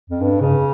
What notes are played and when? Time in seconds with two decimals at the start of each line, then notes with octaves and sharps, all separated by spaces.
0.10 F2
0.21 G2
0.40 C#3